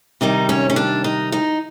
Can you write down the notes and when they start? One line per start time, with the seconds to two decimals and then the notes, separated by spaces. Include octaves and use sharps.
0.21 C3 D#3 G3 D#4
0.49 C#4
0.70 C#4
0.76 D4
1.04 D#4
1.32 D#4